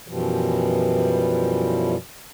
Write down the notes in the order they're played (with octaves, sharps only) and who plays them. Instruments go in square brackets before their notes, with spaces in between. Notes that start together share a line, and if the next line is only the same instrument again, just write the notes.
[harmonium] F#2 B2 E3 F3 G3